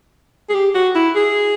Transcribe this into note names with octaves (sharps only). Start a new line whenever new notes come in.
G#4
G4
F#4
E4
G#4